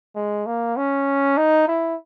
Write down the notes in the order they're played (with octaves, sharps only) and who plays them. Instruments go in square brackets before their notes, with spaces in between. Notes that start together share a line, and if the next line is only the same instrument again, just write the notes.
[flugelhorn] G#3
A#3
C#4
D#4
E4